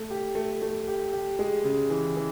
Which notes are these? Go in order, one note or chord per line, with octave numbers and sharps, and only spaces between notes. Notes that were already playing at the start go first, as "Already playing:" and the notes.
Already playing: A3
G4
A3
A3
G4
G4
G#3
C#3
E3
E3